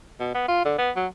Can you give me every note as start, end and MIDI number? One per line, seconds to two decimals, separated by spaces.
0.20 0.34 47
0.34 0.44 59
0.48 0.63 65
0.65 0.74 50
0.78 0.91 59
0.96 1.07 54